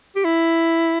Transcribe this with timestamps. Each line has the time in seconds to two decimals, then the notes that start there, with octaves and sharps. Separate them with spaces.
0.16 G4
0.24 E4